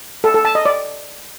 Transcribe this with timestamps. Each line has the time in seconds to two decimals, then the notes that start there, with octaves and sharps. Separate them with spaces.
0.24 A4
0.34 A4
0.45 A5
0.55 D#5
0.66 D5